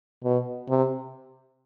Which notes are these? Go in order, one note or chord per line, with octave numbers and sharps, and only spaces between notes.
B2
C3